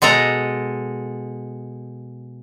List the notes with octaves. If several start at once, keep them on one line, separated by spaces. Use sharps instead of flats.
B2 G#3 A4 A#5